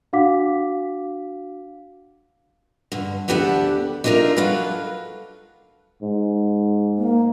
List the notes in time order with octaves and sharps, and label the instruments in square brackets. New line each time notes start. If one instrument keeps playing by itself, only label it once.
[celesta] D4 F#4 F5 F#5 D6 B6
[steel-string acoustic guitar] G2 D3
D2 B3 D4 G4 A4 F#5
D4 D#4 F4 F#4 A#4 E5
F#3 F4 A4 B4
[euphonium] G#2
[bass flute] A#3